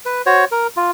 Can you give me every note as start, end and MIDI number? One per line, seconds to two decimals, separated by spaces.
0.05 0.22 71
0.26 0.45 66
0.26 0.45 72
0.26 0.45 73
0.51 0.67 70
0.77 0.91 65